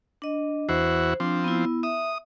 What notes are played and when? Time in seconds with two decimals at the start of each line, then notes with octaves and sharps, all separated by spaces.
0.22 D4 D#5
0.69 E2 E4 F#4 C5
1.20 F3 C4 D4
1.44 B3 E4
1.83 E5 D#6